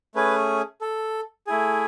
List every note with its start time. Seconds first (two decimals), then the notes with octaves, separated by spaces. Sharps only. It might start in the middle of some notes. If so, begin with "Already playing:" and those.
0.15 A3 C#4 G#4 B4
0.81 A4
1.47 A3 E4 G#4